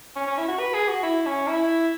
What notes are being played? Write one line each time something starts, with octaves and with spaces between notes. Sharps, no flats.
C#4
C#4
E4
F#4
B4
G#4
F#4
E4
C#4
E4